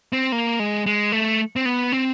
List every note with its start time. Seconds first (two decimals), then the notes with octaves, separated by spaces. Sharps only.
0.13 C4
0.32 A#3
0.60 G#3
0.86 G#3
1.12 A3
1.56 C4
1.66 B3
1.92 C4